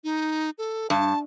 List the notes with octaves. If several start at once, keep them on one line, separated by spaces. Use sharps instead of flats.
D#4
A4
G2 A5